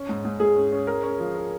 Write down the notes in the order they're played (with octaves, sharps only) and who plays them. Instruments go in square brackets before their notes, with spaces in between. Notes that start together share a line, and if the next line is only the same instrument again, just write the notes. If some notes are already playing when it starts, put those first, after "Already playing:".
Already playing: [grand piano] C#4
G#2
G#2
[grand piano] G#2 [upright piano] G#4
[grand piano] C#4
C#4
A#4
C#4
F3
A#4